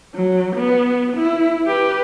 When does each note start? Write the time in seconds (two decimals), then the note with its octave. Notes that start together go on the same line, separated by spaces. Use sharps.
0.15 F#3
0.55 B3
1.16 E4
1.67 G4 B4